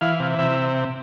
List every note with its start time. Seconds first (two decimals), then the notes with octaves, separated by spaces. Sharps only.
0.01 E3 F5
0.20 C3
0.39 C3 E5